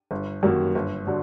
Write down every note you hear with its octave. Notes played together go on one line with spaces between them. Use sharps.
G1
F#2 D#3 F#3 A#3
G1
D3 F#3